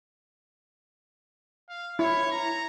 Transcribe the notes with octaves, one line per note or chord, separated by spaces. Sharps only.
F5
E4 C#5
A#5